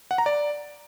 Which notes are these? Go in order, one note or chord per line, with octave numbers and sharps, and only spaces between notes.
F#5
A#5
D5